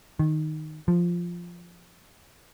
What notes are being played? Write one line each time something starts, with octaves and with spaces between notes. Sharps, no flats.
D#3
F3